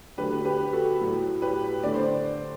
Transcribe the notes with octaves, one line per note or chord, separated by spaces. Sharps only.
D3 F#3 A3 G4 B4
G4 B4
F#4 A4
A2 F#3 A3
G4 B4
D3 A3 D5
C5